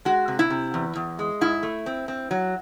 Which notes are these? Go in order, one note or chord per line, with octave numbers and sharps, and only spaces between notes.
G#3 F#4
C3
E4
C3
E2
E2
G#3
G#2 E4
A3
C4
C4
F#3